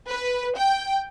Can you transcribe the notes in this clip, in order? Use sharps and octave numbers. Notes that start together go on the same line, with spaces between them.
B4
G5